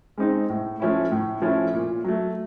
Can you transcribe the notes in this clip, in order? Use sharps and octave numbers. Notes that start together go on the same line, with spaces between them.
G#3 C4 D#4
A2
F3 A3 C#4 E4
A2
F3 A3 C#4 E4
A#2
F#3 A3